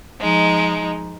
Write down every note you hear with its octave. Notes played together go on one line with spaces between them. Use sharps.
F3 G#3 D#4